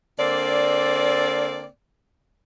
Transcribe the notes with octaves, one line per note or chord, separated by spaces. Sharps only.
D3 A#3 C4 D5